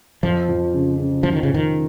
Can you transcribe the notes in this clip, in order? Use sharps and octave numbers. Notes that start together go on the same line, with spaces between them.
F2 F3
F2
C#3
C#3
F1 F3
D#3
F2 C#3
D#3